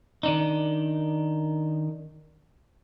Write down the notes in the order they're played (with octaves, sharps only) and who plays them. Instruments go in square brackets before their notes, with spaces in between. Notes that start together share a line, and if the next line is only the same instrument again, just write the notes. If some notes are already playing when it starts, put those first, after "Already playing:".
[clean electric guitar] D#3 D4 D#4